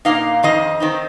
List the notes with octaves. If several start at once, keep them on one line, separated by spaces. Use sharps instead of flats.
A#2 A#3 D#4 F5
F2 D#3 C4 D#4 D#5
D#3 C4 D#4